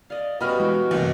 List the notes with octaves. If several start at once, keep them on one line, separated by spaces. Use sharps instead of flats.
D5 D#5 F5
B2 G3 C#4 F#4 D#5 B5 F6
E3 G#3
F#1 C#2 G2 C3 E3